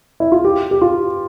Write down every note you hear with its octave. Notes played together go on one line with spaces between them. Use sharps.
E4
F4
G4
G4
F4